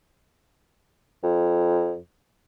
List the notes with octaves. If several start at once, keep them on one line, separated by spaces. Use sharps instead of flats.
F2